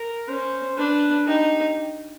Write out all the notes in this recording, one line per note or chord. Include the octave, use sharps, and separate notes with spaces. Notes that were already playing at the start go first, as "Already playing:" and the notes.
Already playing: A#4
C#4 C5
D4 B4
D#4 G4